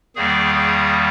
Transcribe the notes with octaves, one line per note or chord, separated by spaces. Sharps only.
E2 D#3 G3 A#3 G#4
G#4